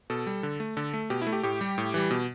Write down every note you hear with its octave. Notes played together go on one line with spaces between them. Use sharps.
B2 A4
G3
D3
A3
D3 A4
A3
B2 G4
E4
A3
G4
A2 G4
G3
A2
E3 G3
B2